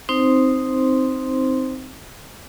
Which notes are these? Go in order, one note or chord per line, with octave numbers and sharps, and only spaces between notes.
C4 D#4 C5 C6